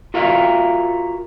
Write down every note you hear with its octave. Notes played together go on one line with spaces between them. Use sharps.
F4 F#4 A#4 E5 F5